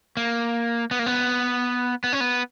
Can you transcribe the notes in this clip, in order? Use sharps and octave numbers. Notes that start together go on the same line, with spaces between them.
A#3
B3
A#3
B3
B3
C#4
B3